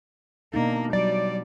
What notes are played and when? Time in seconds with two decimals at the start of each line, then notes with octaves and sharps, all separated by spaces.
0.54 B2 A#3 D4 D#4
0.93 F#3 G3 D5